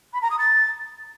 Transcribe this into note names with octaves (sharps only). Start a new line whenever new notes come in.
B5
A#5
D#6
A6